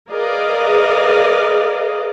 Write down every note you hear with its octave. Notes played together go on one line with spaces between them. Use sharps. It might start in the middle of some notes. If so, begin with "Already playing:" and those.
G#4 A#4 B4 D5 D#5 F5